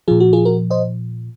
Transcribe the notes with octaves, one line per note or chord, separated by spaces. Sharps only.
A#2 F3 F4 G#4
F#4
F4 G#4
F#4 A#4
C5 D#5